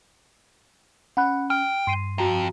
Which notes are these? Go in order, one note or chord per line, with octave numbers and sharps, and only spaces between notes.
C#4 F#5 B5 F#6
G5 F6
G2 C6 C7 D#7
F2 F#4 A#5